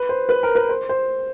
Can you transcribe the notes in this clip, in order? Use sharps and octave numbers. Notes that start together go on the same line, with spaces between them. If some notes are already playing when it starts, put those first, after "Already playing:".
Already playing: B4
C5
B4
A#4
B4
C5
C5